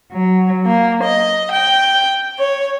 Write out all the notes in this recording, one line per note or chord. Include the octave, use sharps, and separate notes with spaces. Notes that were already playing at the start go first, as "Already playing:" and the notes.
F#3
A#3
D#5
G5
C#5